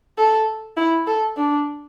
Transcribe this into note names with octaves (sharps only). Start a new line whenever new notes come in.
A4
E4
A4
D4